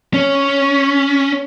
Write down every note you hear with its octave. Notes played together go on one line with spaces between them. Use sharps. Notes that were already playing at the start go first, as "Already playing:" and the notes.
C#4